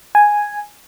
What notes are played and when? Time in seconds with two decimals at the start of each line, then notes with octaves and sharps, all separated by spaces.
0.15 G#5